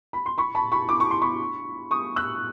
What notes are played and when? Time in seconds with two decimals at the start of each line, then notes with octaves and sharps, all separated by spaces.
0.13 B5
0.26 C6
0.38 B5 C#6
0.55 A5 B5
0.72 B5 C#6
0.89 D6
1.00 C#6
1.11 C6
1.21 B5 C#6
1.91 C#6 D#6
2.16 E6 F#6